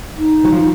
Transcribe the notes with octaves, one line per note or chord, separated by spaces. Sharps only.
D#4
F#3
F3